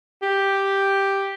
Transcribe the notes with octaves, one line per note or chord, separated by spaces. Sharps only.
G4